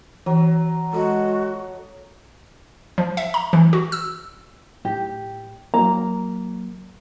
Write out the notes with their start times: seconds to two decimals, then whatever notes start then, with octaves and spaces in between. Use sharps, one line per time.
0.26 E3 F#3
0.93 G#3 F#4 A4 D#5
2.98 F3
3.17 E5
3.34 A#5
3.53 E3
3.73 F#4
3.92 E6
4.85 A2 G4
5.74 F#3 A#3 A#5